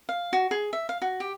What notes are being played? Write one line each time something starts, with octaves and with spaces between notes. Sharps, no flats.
F5
F#4
G#4
E5
F5
F#4
G4